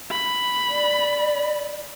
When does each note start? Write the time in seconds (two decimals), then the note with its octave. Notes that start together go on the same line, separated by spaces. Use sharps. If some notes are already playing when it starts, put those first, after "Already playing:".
0.11 B5
0.69 D5